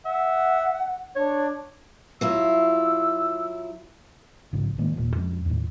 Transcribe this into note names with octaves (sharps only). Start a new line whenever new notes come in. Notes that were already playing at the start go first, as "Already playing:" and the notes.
E5 F#5
D4 C#5
F#3 E4 F4 E6
A#1 G#2 C#3
A2 D#3 G#3 A#3
D#1 A#2
F2 G#3 C#4
D#2 A2